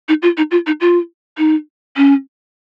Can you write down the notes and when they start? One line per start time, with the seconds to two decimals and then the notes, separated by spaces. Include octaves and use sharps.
0.09 D#4
0.22 F4
0.37 D#4
0.51 F4
0.67 D#4
0.81 F4
1.38 D#4
1.96 C#4